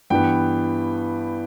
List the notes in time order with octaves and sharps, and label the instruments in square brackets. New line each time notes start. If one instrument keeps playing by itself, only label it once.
[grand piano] G2 E3 B3 G5